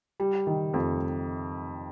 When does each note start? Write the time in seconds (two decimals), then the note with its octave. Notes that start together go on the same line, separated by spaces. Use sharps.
0.20 G3
0.47 D#3
0.74 F2